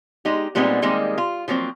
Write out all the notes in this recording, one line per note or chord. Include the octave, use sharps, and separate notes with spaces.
G#3 D#4 G4
A#2 G3 G#3 B3 C4 D#4
D#3 G3 G#3 A#3 C4 D#4
F4
F3 F#3 A#3 C4